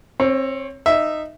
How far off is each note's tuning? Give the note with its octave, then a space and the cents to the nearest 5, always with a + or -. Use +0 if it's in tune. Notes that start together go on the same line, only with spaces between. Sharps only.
C4 +25 C#5 +0
D#4 -10 E5 +0